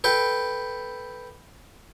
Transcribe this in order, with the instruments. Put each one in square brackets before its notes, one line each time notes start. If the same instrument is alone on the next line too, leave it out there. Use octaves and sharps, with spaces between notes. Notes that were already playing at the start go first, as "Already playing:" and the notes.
[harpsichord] A4 B4 G5